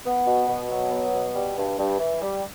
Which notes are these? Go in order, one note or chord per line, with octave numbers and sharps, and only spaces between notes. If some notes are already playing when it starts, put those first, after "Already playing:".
B3
B2
B2
F#3
B3
B2
G3
G2
G2
E3
G3